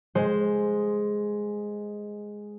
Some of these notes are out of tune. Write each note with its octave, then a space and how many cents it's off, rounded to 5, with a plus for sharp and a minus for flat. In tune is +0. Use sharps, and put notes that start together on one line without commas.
G#3 +0 C5 +0